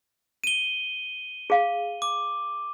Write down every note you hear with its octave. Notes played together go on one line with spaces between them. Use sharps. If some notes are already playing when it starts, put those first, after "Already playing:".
D#7 G7
G#4 F5
D6